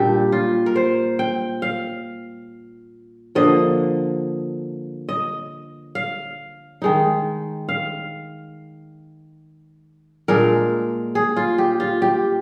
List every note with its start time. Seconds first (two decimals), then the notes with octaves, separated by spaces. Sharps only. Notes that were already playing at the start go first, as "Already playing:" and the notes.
Already playing: A#2 G3 D4 G4
0.32 F4
0.66 A#4
0.76 C5
1.19 G5
1.62 F5
3.35 D3 F3 A#3 D#5
5.09 D#5
5.95 F5
6.82 D#3 G#3 D#4
7.69 F5
10.28 A#2 G#3 D4 A#4
11.15 G#4
11.37 F4
11.58 G4
11.80 F4
12.02 G4